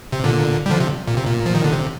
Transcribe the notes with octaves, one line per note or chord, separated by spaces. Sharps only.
C3
A#2 D3
G3
D3 F3
C3
A#2
C3
A#2
F3
D#3
D3
C3